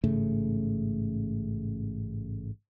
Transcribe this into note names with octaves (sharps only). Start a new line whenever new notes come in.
A1 G#2 C#3 A3